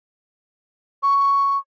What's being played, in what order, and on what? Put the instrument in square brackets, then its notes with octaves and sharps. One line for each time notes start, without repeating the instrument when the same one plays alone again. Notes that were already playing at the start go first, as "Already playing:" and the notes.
[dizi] C#6